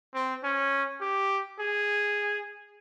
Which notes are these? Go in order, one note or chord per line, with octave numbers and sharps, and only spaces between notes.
C4
C#4
G4
G#4